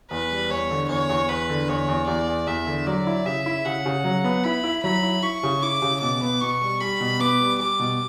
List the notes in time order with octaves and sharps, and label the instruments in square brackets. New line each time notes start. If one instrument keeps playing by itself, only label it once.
[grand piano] E2 [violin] B4
[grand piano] G3
[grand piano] E2 [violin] C#5
[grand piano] D3
[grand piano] E2 [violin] C#5
[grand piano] E2
[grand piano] E2 [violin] B4
[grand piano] D3
[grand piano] E2 [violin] C#5
[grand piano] E2
[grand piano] E2 [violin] D5
[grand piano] E2
[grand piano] E2 [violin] E5
[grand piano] D3
[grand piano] F#3 [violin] D5
[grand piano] E4
[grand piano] C#3 [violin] E5
[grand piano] E4
[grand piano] C#3 [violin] F#5
[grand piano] C#3
F#3
B3
[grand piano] E4 [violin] B5
[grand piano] E4
[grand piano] F#3 [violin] B5
[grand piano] E4
[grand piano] E4 [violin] C#6
[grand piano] C#3
[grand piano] E4 [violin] D6
[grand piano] C#3
[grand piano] B2 [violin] D6
[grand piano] B3
[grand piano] B2 [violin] C#6
[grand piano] G3
[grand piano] G3 [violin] B5
[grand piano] B2
[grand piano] B3 [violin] D6
[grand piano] G3
[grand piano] G3 [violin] D6
[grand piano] B2